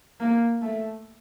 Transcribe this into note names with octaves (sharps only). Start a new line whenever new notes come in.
A#3
A3